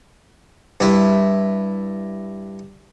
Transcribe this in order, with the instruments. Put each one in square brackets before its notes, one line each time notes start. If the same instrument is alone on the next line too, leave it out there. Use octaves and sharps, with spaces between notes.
[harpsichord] G2 E4